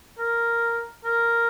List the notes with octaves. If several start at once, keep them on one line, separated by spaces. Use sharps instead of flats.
A#4
A#4